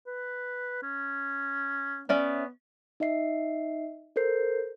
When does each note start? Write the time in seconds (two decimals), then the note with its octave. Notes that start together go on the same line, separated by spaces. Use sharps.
0.07 B4
0.82 C#4
2.09 B3 C#4 D5 E5
3.00 D#4 D#5 E5 C7
4.16 A4 A#4 C5 G6 C7